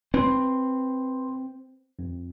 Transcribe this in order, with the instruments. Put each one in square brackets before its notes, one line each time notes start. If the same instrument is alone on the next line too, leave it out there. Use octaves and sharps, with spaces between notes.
[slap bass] C4 [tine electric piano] B4 C6
[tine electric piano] F2